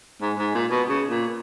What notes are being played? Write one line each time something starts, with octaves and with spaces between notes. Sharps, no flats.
G#2
G#2
A#2
B2
C#3
A#2